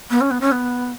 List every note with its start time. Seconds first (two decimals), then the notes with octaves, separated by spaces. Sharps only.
0.10 B3
0.21 C#4
0.31 B3
0.40 C#4
0.51 B3